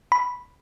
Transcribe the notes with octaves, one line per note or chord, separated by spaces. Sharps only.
B5